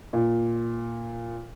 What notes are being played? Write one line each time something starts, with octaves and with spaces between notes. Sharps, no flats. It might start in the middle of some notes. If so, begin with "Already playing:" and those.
A#2